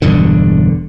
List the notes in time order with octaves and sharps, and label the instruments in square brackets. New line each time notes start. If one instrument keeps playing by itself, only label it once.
[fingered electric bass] E1 E2 G2 D3